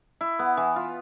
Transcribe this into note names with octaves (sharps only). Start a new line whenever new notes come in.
E4
B3
E3
F4